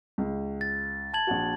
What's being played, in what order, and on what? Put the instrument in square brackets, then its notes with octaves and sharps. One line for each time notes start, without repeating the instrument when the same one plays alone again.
[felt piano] C#2
[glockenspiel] A6
A5 G#6 F#7
[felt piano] A#1 F#4